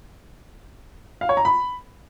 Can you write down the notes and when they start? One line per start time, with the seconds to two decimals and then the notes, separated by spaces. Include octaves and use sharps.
1.21 F5
1.29 C#5
1.37 A#5
1.45 B5